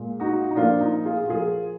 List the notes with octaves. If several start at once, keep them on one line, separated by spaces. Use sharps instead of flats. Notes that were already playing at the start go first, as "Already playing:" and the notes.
Already playing: A#2 G#3
D#4 F#4
D#4
A#2 F3 A#3 D4 F4
D#4
F4 G#4
F#4
A#2 F3 A#3 F4 G#4